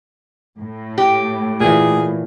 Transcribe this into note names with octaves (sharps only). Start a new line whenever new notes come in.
A2
G4
A#2 E3 G#4